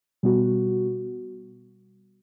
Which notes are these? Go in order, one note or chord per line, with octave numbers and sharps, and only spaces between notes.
B2 G3 B3 F#4